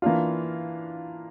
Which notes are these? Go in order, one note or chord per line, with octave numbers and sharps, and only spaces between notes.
E3 A#3 D4 F4